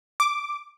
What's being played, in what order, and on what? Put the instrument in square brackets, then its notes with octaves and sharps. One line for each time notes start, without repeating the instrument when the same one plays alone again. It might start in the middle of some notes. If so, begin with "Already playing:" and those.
[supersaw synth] D6